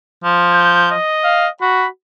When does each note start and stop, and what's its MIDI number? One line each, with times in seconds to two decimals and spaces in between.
0.24 0.93 53
0.53 0.90 91
0.91 1.49 75
1.24 1.46 77
1.61 1.86 66
1.61 1.87 83